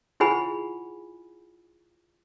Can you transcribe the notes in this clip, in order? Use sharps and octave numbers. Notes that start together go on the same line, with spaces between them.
E4 F4 G#4 F#5 G#5 B5